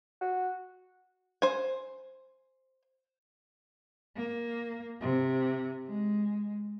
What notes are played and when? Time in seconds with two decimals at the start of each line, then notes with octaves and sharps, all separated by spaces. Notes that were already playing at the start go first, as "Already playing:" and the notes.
0.21 F#4
1.42 C5 G#5
4.16 A#3
5.01 C3
5.87 G#3